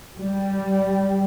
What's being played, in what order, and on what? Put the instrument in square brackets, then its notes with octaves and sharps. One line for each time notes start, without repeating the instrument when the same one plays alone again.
[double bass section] G3